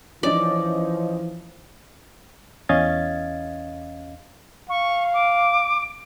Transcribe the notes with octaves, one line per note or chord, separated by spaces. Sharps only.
E3 F3 C#4 D#4 D5
E2 C#4 D#5 F5 G#6 A6
F5 C#6
D6